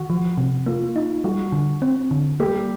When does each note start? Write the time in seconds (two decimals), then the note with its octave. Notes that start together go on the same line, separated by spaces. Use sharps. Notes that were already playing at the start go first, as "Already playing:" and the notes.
Already playing: D#3 F#4
0.10 F3
0.38 C3
0.66 A#3 F4
0.96 D#4
1.24 G3 F#4
1.52 D3
1.82 C4
2.11 D3
2.40 G3 A#3 G4